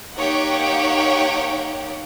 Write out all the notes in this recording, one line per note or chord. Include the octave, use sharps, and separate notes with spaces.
A#3 D#4 G4 C#5 F#5 G5